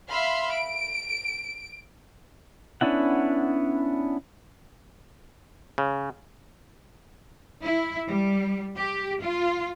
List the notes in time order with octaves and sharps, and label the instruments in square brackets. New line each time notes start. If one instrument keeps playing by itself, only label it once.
[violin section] E5 F5 B5 C6
D7
[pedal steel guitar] B3 C#4 D4 E4 F#5
[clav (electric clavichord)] C#3
[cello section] E4
G3
G4
F4